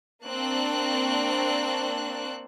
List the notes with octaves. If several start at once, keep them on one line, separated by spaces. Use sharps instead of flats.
A#3 C4 D4 A5 C#6 F#6